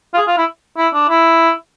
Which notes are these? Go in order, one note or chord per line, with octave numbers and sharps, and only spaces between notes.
F4
G#4
F4
E4
E4
D4
E4